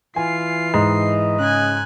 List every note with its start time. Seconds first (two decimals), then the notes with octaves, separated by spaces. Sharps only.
0.16 E3 F4 G#5 C7
0.74 G#2 D#5
1.39 C#3 G#5 F#6